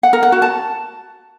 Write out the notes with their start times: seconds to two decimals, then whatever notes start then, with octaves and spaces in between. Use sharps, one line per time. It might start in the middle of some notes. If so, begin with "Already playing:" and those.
0.03 F#5
0.13 A#4
0.23 F#5
0.32 F#4
0.42 A5